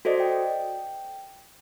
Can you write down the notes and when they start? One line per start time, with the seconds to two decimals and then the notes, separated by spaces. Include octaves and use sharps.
0.05 F#4 A4 C5 D5 D#5
0.20 G5